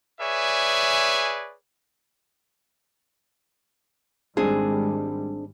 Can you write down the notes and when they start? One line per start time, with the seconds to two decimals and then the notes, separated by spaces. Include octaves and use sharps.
0.20 G#4 B4 C#5 D5 E5 G#5
4.37 G#1 G3 G#3 C4 D4 G#4